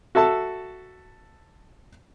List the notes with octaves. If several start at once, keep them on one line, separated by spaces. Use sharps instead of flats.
F#4 A4 E5 A5